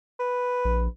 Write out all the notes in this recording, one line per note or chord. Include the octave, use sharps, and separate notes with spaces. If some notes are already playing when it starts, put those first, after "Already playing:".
B4
A#1